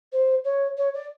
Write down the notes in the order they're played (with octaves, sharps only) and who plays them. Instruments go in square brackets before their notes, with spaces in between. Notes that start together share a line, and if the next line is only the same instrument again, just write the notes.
[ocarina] C5
C#5
C#5
D5